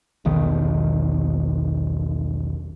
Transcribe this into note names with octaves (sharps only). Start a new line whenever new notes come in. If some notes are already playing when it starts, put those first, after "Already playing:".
E1 B1 D#3